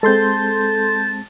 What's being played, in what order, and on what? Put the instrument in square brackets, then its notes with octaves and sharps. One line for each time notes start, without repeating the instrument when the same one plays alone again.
[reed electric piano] G#3 C4 [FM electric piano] A4 C6 G6 [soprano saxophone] A5